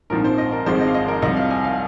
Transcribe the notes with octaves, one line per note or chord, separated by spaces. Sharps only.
A#1 G#2 F3 C4 D#4 A#4
C5
D#5
A#4
G#1 G#2 F3 G#3 C4 C5
D#5
F5
D#5
A#4
C2 C3 F3 D#5
F5
G#5
F5